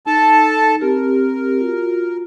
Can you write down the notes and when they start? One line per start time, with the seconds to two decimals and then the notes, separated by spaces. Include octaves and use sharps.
0.07 D#4 A4 A5
0.81 C4 G4 A#4
1.61 F4 F#4